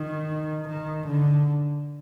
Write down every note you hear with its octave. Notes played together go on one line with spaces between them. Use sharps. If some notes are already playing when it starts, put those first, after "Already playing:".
Already playing: D#3
D#3
D3